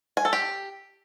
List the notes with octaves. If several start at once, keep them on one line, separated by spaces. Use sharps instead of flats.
G#5
A4
G4